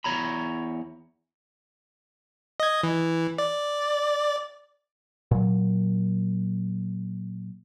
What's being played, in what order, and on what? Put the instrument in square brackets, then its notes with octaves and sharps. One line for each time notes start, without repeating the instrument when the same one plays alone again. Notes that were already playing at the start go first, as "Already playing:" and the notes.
[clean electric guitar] E2 G#2 C#5 A#5 B5
[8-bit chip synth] D#5 G#6
E3
D5
[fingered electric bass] A#2 F#3